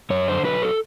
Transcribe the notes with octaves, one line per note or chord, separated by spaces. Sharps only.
F#2 C#5
D3 C5
F#3 B4
A4